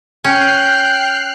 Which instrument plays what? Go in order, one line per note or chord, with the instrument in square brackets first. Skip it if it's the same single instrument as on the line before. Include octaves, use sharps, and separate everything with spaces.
[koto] C#4 [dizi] G5 [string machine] F6 F#6 C7